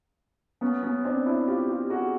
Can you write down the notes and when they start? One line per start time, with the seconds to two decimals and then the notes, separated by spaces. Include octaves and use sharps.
0.61 B3 C#4
0.83 B3 C#4
1.05 C4 D4
1.26 D4 E4
1.47 F4 G4
1.68 F4 G4
1.90 F#4 G#4